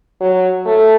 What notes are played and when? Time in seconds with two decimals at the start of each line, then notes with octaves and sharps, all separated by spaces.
0.21 F#3
0.65 A3